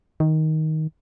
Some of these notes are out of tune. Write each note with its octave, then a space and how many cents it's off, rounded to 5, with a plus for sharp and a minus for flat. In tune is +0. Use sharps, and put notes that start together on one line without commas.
D#3 +10